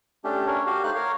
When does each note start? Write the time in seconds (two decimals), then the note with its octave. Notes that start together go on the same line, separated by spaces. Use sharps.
0.24 A3 C#4 D4 G4
0.47 C#4 D4 A#4 C#5
0.66 F#4 G4 F5
0.84 A3 D#4 C5 F5 F#6
0.95 A#4 C#5 F5